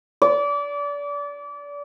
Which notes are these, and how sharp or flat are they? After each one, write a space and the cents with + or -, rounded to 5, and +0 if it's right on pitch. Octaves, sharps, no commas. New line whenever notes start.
D5 -30